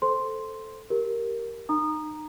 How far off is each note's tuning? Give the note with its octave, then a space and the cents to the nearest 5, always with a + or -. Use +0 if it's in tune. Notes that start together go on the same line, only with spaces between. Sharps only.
A4 +0 C5 +0 C6 +0
G4 +0 A#4 +0
D#4 -30 A#5 +0 D#6 -25